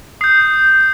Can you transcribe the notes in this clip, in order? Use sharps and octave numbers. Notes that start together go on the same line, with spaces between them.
D#6 G6 C7